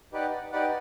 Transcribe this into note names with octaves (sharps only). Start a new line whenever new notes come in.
D#4 G4 B4 D5 F#5
D#4 G4 B4 D5 F#5